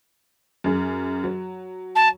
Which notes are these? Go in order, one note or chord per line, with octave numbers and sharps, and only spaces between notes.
F#2 G#4
F#3
A5